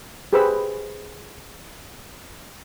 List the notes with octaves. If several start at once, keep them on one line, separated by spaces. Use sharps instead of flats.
G4 G#4 B4 C5 B5 E6